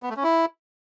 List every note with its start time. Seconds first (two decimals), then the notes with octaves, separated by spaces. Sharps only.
0.03 B3
0.10 A3
0.17 C#4
0.24 E4